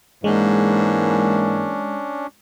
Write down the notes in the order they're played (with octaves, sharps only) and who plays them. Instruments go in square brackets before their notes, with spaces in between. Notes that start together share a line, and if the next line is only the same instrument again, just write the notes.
[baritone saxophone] G#2 [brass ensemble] E3 A#3 [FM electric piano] G#3 [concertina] C#4 D4